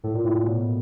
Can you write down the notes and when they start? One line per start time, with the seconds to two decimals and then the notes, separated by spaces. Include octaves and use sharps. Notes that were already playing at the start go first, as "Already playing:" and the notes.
0.04 A2
0.14 A#2
0.24 A2
0.35 A#2
0.46 B2